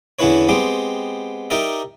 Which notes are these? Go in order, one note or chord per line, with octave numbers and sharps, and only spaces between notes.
E2 D3 C#4 E4 B4 C#5
G#3 B3 C4 G4
D#4 G4 A#4 D5 E5